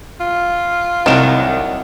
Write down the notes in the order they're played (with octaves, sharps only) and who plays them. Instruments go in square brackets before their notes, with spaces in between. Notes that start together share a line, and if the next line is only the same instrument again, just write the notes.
[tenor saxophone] F4
[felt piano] C2 E7 [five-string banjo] D#3 F#3 D4